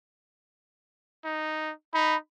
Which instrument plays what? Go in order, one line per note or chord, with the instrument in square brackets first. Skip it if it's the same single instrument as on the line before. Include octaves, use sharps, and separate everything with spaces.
[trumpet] D#4
[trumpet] D#4 [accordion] B5